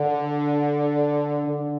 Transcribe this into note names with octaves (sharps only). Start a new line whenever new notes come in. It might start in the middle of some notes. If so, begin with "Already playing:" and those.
Already playing: D3
D3